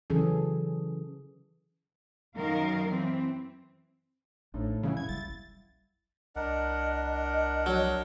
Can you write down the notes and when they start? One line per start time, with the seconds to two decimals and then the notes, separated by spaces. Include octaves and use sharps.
0.10 C#3 E3 F#3 C#4 G#4 A4
2.35 F#2 D#3 A#4 F5
2.88 E3 C4
4.54 A1 A2 F3 D4 D#4
4.83 C#3 E3 G3 C#4 E4 F5 F#5
4.97 F#2 A#2 G#6
5.09 F#1 B1 G3 A6
6.36 C2 D4 A#4 D#5 F#5
7.66 F#3